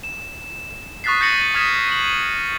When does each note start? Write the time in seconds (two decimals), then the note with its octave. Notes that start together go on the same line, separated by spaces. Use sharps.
0.04 E7
1.04 C#6 D#6 F#6 A6 B6 C7
1.21 G6 A6 A#6 C#7 D#7 F#7
1.55 D#6 F6 G#6 B6 E7
1.89 D#7 F#7